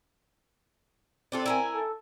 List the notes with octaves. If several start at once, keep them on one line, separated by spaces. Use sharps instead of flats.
C4 D4 F4 A4
E4 A#4 G#5
A4